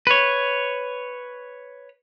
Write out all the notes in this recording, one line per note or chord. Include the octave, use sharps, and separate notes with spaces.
B4 C#5